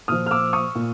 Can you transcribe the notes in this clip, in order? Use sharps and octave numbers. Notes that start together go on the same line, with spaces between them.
A#2 F3 D#6 F6
F6
D6 E6
C#6 D#6
A#2